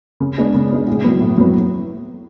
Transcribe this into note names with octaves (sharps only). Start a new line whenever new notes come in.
C#3
G#3 B3 D4
C#3
G#3 B3 D4
A2
F#3 B3
A2
F#3 B3